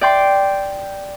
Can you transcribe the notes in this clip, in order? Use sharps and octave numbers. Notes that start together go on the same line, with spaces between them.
D5 G5 C6